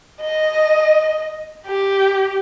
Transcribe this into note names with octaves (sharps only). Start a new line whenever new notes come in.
D#5
G4